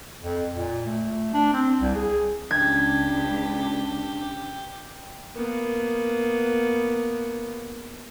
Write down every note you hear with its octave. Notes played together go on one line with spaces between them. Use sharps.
F2
A#2
A3
D4
C4
C2
G#4
C#2 D4 G4 G#6
A#3 B3